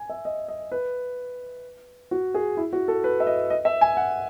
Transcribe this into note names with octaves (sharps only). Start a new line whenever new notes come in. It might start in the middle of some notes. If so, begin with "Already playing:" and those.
Already playing: G#5
E5
D#5
D#5
B4
F#4
G#4
E4
F#4
A4
B4
E5
D#5
D#5
E5
G#5
F#5